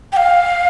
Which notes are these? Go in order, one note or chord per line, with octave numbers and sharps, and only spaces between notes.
G5
F5